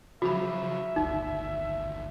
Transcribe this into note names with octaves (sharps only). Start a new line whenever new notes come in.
C#3 F3 F#3 F#4 E5 B5
G1 D2 D#4